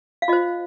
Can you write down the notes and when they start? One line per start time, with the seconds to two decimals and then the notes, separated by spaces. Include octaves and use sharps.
0.22 F5
0.28 F4 C5 D#5